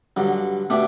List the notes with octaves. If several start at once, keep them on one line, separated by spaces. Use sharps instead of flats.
G2 D3 F#3
B2 A3 D4 G4